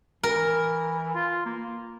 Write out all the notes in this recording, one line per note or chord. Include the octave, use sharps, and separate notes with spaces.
E3 A#4
F4
A#3